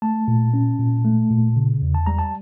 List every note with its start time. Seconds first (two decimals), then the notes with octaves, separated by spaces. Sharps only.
0.02 A3 A5
0.28 A#2
0.54 C#4
0.79 A#2
1.05 A3
1.30 A#2
1.56 C#3
1.82 E2
1.95 A5
2.06 G3 A#5
2.19 A5